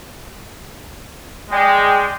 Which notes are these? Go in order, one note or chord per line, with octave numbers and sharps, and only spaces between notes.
G#3 D5 G5